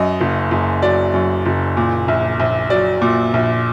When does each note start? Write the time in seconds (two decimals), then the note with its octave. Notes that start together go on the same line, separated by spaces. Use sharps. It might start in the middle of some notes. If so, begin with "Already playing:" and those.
Already playing: F#2 D#5
0.21 F#1
0.51 F#1
0.82 F#3 D5
1.14 F#2
1.46 F#1
1.77 A#2
2.08 A#1
2.39 A#1
2.70 F#3 D5
3.02 A#2
3.34 A#1